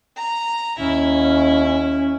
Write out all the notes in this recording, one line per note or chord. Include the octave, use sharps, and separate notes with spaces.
A#5
D#2 C#4 E4
C#4